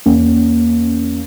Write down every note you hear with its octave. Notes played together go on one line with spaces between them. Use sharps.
E2 A#3 C#4